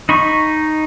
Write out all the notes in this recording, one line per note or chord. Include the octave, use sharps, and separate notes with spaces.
D#4 B5 C#6